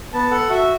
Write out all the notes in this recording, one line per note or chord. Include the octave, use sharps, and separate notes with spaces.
B3 A5
A4 F#5
F#4 E5